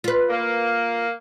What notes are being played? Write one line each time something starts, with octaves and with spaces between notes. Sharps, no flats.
F4 B4
A#3